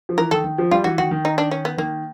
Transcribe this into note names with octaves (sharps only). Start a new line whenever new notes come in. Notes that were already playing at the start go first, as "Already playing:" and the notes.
F3
E3 A#4
D#3 A4
D#3
F3
G3 F4
E3 F#4
D#3 F#4
D#3
D#4
D4
C#4
B3
D#3 A#3